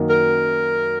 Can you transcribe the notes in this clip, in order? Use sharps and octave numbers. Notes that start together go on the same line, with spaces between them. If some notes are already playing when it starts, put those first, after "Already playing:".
Already playing: F#2 D#3 F#3 A#3 D#4
A#4